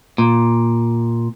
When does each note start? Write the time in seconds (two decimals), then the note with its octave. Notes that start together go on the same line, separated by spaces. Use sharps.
0.18 A#2